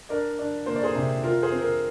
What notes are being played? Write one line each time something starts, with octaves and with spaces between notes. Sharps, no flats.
D4 A#4 D5
D4
A#3 C5
D5
G#4 C5
C3
F4 A#4
G#4 C5
C4
A#4